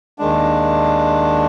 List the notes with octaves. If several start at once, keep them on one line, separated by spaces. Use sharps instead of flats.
D#2 D#3 G#3 D4